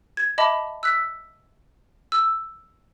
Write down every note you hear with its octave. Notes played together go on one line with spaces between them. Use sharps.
G#6
D#5 E5 A5 B5 D6
E6 F#6 B6
E6